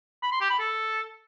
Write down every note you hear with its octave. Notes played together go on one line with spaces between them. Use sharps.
B5
C6
G4
B5
A4